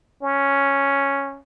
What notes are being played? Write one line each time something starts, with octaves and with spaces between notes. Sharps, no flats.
C#4